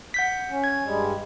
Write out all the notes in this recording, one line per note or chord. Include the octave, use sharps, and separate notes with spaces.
F#5 G6 B6
C#4
G#6
G2 G3 G#3